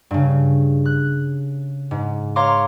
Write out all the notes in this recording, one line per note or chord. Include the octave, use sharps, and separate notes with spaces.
G2 C#3
F#6
G#2
C#5 F5 A#5 C6 D6